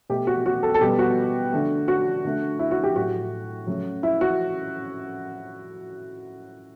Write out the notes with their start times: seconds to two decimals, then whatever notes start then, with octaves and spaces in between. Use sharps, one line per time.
0.09 B2 A3 G4
0.27 F#4
0.46 F#4
0.63 A4
0.74 A4
0.81 B2 G3 B3 G4
0.99 F#4
1.52 D3 A3
1.88 F#4
2.25 D3 A3
2.59 E4
2.71 F#4
2.83 G4
2.96 A2 F#3 A3 F#4
3.67 C#3 F#3 A3
4.03 E4
4.21 F#4